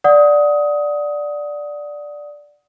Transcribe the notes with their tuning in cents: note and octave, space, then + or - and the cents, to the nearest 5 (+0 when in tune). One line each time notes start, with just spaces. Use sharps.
D5 +0 F#5 -10 D#6 +20